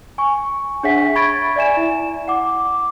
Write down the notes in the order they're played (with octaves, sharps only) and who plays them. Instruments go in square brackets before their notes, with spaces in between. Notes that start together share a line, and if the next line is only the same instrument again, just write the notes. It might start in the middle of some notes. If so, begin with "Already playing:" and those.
[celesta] G#5 C#6
D4 G#4 C#5 E5 F#5 B6
B5 C#6 G#6 A6 D7
D5 E5 G#5 E7
E4
F#5 D6